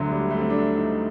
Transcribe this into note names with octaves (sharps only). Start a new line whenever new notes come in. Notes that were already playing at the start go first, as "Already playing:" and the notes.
Already playing: D2 D3 F#3 A3
G3
A3
C4
D4
D#4